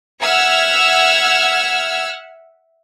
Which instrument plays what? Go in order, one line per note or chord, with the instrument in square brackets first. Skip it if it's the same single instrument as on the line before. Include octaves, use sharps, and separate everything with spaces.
[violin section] E5 F#5 E6 F6 G#6